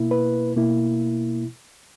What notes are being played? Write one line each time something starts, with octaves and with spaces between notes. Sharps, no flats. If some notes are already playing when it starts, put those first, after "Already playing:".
Already playing: B2 A#3 E4
B4
B2 A#3 E4